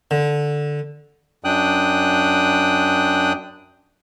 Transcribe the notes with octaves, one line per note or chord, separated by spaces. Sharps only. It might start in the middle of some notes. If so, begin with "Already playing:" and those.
D3
F#2 D4 G5 D#6 F#6